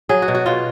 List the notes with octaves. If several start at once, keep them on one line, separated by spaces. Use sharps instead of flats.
F#3 G#4
F#4
B2
F#4
B2 F4